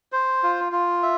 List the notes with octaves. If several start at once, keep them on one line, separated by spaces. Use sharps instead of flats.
C5
F4
F4
E5